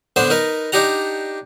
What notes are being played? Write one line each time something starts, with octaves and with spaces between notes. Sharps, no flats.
D3 B3 D4 C5
D#4 A#4 B4
D4 D#4 G4 F#5 A#5